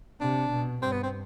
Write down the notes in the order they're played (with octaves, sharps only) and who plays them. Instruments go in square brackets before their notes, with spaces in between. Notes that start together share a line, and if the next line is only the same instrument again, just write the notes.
[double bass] C3 [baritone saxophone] D4
[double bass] B2
[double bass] G2 [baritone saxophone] C4
[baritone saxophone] B3
C4